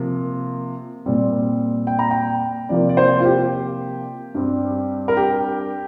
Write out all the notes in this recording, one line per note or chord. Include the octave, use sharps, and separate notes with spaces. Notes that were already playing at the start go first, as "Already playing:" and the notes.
Already playing: C3 F3 A#3
A#2 G3 C4
G5
A#5
G5
C3 F3 A#3 D5
D5
C5
F4
G4
G2 G3 C4
A#4
G4